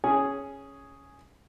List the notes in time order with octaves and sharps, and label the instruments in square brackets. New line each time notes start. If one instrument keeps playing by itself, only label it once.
[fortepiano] C#4 G#4